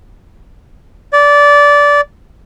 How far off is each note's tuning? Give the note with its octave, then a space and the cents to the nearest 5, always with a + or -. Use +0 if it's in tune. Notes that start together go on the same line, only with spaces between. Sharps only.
D5 -20